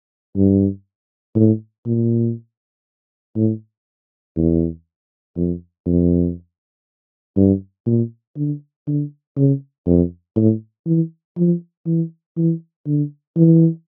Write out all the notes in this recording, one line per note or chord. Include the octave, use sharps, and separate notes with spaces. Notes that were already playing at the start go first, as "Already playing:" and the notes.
G2
A2
A#2
A2
E2
F2
F2
G2
A#2
D3
D3
C#3
F2
A2
E3
F3
E3
E3
D3
E3